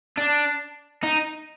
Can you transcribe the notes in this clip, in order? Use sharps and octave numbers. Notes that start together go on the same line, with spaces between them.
D4
D#4